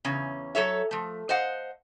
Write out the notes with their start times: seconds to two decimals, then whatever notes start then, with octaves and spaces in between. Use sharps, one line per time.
0.05 E2 C#3 C#4
0.55 F#3 A4 C#5 E5
0.91 F3 A3
1.29 C5 D#5 F5 F#5